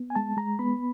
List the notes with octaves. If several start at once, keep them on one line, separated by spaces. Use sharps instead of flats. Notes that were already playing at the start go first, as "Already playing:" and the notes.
Already playing: B3
G#5
G#3 A5
G#3 A#5
B3 B5